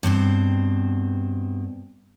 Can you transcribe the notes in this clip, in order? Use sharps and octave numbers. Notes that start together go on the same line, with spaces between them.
G2 B2 C4 C5